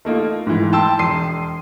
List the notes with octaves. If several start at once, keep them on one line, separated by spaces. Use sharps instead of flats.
A3 A#3 D#4 F4
G#2 E3
G5 A5 C6 E6
E1 C6 C7 D#7